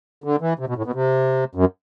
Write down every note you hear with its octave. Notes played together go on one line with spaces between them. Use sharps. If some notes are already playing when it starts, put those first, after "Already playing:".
D3
E3
C3
B2
A2
B2
C3
F#2